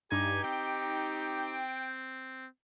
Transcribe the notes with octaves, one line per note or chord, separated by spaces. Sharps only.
G2 D#4 G4 G#5
C4 G5